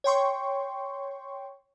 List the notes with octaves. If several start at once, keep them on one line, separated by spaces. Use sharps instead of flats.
C#5 G5 C6 C#6